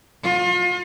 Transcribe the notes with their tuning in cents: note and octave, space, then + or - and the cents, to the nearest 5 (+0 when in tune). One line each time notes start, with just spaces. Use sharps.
F4 +35